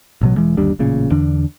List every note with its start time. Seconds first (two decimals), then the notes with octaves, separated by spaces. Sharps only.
0.21 A1 B2 F#3
0.37 E1 E3 G#3
0.57 G1 D#2 G3 D4
0.79 A1 A#2 C#3
1.11 E2 D3 D4